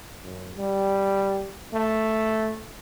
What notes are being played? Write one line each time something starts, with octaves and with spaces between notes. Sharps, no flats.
F#2
G3
A3